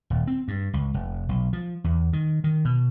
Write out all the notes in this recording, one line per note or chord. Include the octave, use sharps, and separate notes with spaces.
D#1
C4
G2
C#2
F1
B1
F3
E2
D#3
D#3
B2